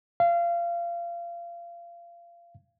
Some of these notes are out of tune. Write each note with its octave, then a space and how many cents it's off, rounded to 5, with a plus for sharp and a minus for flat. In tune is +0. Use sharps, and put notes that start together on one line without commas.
F5 -25